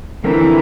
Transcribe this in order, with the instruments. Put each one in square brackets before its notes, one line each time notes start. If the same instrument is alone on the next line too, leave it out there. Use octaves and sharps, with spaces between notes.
[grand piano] D3 F3 C4 F4 A#4 [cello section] E3